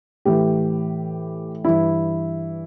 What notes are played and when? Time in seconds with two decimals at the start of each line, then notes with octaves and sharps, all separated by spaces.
0.25 A2 E3 G4
1.64 G2 E3 E4